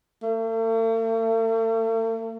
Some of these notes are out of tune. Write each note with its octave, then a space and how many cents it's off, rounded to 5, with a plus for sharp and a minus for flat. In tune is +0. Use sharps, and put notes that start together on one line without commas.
A3 +45